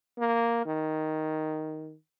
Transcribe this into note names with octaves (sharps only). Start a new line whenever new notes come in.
A#3
D#3